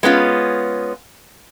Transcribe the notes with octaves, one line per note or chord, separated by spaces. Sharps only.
G#3 B3 C#4 F4